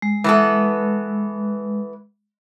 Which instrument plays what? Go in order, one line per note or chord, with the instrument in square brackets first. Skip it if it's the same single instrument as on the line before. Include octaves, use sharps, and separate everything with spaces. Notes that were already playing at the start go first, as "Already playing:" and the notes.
[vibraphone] G#3
[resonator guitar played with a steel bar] E3 B3 A4